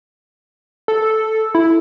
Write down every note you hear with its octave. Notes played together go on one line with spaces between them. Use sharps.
A4
E4